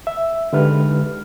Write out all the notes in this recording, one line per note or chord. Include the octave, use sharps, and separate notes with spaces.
E5
D3 G#3 D#4 G4 B4 F6